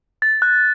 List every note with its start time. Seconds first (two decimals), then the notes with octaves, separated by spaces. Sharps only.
0.22 A6
0.42 F#6